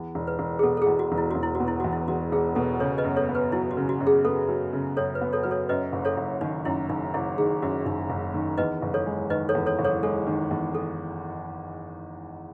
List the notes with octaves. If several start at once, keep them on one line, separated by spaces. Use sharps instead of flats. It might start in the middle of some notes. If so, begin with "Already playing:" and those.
Already playing: E2
E1
B4
E1
G#4
B2 A4
A4
G#4
E2
F#4
E1
E4
E1 F#4
E4
F#4
B2
E4
E2 F#4
E4
E1 F#4
E1 G#4
B2 A4
C#3 A4 C#5
B4 D#5
F#2
A4 C#5
B3
B4
F#3 E4
F#4
C#3
F#4
F#2
G#4
B3 A4
F#3
C#3
F#2 A4 C#5
B4
B3
A4 C#5
F#3 B4
A4 C#5
F#2 B4 D#5
F#1
A4 C#5
F#1
D#3 D#4
F#2 E4
F#1 D#4
F#1 E4
D#3 G#4
F#2 F#4
F#1 D#4
F#1
D#3
E2 B4 D#5
F#1
A4 C#5
G#3
D#3 B4 D#5
A4 C#5
E2
A4 C#5
F#1
A4 C#5
G#3 A4
D#3
E2
A4